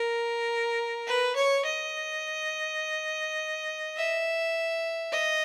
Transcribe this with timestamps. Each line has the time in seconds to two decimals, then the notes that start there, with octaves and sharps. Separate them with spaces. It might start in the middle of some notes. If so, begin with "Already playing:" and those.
Already playing: A#4
1.07 B4
1.36 C#5
1.65 D#5
3.97 E5
5.12 D#5